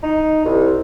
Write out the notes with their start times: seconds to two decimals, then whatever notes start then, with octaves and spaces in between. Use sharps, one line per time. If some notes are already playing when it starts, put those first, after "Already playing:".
0.03 D#4
0.45 C2